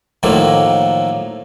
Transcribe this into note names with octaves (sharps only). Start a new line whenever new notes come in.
A2 D#3 F3 F#3 A3 A#3